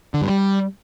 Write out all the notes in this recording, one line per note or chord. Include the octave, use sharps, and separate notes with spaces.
D3
G2
G3